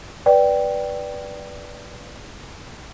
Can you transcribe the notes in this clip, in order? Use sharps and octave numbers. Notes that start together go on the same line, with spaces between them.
B4 D5 G5